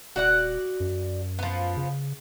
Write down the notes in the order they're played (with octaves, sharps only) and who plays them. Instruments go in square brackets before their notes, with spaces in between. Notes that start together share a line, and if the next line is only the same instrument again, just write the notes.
[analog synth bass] D#1 [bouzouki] F#4 D5 F#5
[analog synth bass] F#2
[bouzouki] F3 B3
[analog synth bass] C#3